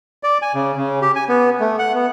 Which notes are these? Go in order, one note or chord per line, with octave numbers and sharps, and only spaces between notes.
D5
G#5
C#3
C#3
G4
G#5
B3
A3
F#5
B3